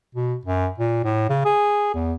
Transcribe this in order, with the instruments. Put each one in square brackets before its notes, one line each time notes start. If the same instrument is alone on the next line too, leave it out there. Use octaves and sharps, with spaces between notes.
[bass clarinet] B2
F#2
A#2
A2
C#3
G#4
E2